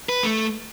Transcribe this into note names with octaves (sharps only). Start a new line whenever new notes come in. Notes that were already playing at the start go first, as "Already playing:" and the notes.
B4
A3